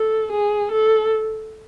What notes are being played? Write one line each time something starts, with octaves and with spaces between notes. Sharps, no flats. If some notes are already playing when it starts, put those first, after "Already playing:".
Already playing: A4
G#4
A4